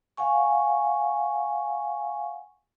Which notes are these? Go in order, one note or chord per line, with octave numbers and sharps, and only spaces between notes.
F5 F#5 G#5 C#6